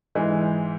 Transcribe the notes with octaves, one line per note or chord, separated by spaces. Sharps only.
G#2 E3 G#3